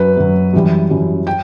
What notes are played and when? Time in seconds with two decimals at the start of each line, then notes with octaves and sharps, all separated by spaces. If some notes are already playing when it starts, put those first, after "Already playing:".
Already playing: F#2 F#3 B4
0.17 F#2 F#3
0.53 F#2 E3 G3
0.90 F#2 E3 G3
1.27 G5